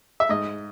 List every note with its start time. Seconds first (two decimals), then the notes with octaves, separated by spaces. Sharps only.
0.20 E5
0.29 G#2 D#5